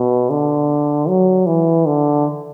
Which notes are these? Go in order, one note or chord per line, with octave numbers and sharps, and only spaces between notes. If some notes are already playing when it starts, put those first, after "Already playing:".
Already playing: B2
D3
F#3
E3
D3